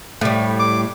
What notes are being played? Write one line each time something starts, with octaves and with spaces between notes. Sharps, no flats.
A2 G3
D6